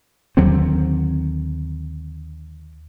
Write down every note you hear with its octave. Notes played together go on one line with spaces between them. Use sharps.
D#2 D3 F#3 C4